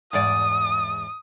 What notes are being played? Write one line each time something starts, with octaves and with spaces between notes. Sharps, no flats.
E2 G#2 D5 D#6